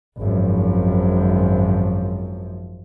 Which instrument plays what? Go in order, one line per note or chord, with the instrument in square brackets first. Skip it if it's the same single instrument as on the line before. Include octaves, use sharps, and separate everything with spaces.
[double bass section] G#1 F#2 F3